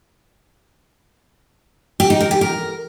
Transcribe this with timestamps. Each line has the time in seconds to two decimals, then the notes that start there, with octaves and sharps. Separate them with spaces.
2.00 G4
2.10 D#4
2.21 A#4
2.31 G4
2.41 A#4